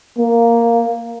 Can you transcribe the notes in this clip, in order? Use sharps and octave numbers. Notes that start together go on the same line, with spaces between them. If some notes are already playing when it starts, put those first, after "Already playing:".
A#3